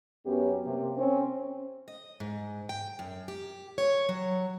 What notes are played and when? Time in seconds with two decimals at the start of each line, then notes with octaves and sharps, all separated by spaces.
0.24 F#2 F#3 B3 C#4 G4
0.65 C3 A#3 C4
0.98 C4 C#4
1.88 D#5
2.20 G#2
2.69 G5
2.99 F#2
3.28 G4
3.78 C#5
4.09 F#3